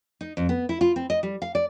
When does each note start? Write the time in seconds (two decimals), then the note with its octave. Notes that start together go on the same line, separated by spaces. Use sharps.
0.21 D#4
0.37 F2
0.49 B3
0.69 E4
0.81 F4
0.96 C4
1.10 D#5
1.23 G3
1.42 F5
1.55 D5